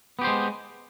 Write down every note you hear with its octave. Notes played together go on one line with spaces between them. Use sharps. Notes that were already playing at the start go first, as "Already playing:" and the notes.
G#3 B3 G4 C5